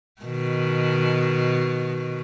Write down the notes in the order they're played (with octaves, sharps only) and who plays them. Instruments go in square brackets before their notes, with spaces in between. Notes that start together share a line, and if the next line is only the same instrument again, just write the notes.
[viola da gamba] B2 D#3